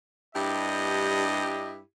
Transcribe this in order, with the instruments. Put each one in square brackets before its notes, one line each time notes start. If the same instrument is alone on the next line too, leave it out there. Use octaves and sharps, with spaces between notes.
[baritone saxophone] G2 [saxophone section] D4 E4 G4 [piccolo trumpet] D#5